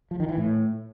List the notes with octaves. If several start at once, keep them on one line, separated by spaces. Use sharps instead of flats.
F3
D#3
E3
A2